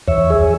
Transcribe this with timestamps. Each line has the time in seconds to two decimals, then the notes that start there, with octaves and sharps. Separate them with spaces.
0.08 E2 C#5 E5
0.30 G#4